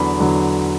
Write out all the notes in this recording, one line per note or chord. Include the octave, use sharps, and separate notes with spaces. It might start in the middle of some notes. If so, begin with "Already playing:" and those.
Already playing: E2 D3 F#3 B5
E2 D3 F#3